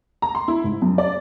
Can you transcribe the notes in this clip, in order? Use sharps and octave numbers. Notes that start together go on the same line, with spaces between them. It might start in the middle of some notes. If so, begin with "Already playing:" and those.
A#5
C6
E4
G#2
F#2
D5